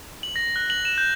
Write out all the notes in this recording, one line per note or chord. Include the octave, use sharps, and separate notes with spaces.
F#7
A#6
F#6
F#7
E7
G6